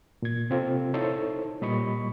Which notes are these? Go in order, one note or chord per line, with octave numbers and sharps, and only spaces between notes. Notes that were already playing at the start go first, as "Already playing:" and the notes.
A#2 G#6
C3 C4 F4 A4 C5
D#4 E4 A4 C5 C#5
A#2 G3 D#5 B5 C#6